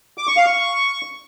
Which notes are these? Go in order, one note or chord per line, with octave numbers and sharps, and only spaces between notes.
D6
C#6
F5
C#6